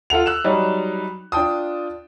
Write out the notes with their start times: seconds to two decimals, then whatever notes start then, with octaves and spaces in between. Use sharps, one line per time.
0.10 F4 A4 F#5 F7
0.26 E6 F#6 E7
0.44 F#3 G3 D#4
1.32 D4 F4 G5 A5 D#6